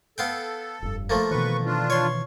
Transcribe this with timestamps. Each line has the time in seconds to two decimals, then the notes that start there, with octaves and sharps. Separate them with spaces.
0.18 B3 A4 F5 G5
0.82 F1 G2
1.10 F3 A3 A#3
1.31 B2 D#3 E3 B4 C#6
1.66 D4 F4
1.90 C#5 C6